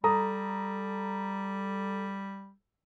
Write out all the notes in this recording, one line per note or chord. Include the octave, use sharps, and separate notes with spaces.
G3 A4 A#5 D#6